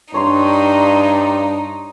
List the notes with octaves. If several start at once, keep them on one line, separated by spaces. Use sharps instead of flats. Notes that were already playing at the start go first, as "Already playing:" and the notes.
G2 D4 D#4 C#5 A#5 C6